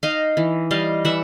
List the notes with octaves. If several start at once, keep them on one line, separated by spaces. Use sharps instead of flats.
D#4 D#5 F5
E3
G3 D#5 F5
E3 E5 F#5